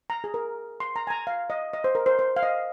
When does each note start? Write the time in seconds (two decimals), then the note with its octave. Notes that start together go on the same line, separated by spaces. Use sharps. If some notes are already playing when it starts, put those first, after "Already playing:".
0.10 A#5
0.24 G#4
0.34 A#4
0.80 C6
0.96 A#5
1.07 G#5
1.10 A#5
1.27 F5
1.50 D#5
1.73 D#5
1.84 C5
1.95 A#4
2.06 C5
2.19 C5
2.36 F5
2.43 D#5